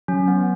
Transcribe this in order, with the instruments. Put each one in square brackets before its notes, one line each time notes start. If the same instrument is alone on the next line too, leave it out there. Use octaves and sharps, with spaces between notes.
[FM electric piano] F#3 [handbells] C#4
[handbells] B3